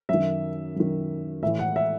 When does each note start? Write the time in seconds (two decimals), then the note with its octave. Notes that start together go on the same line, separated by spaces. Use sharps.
0.09 F#2 D#3 E5
0.76 F#2 D#3
1.43 A2 E5
1.47 E3
1.59 F#5
1.76 E5